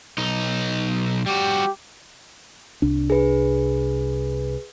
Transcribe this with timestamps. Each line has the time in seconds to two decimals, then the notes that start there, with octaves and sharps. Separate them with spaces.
0.18 B1 D#4
1.26 G3 F#4 G4
2.82 C2 D4
3.10 G#4 B4